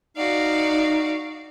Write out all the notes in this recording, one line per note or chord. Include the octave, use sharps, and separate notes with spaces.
D#4 F#4 D5 F5